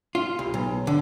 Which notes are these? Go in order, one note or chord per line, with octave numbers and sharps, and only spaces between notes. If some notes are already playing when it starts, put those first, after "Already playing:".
F4
C2
B1
D3